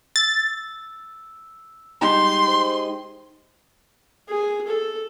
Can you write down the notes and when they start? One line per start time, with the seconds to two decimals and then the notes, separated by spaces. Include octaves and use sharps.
0.16 E6 A6
2.01 G3 G#3 D#4 G4 C6
2.48 C5
4.29 G#4
4.68 A4